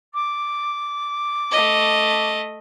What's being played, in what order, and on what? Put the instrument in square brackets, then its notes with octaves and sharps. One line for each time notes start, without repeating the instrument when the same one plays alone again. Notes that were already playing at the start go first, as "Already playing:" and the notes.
[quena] D6
[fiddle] A3 D#5